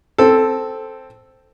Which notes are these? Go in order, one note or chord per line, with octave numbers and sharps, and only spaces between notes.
C4 A4